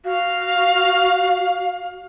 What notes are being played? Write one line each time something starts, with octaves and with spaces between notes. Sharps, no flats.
F#4 F5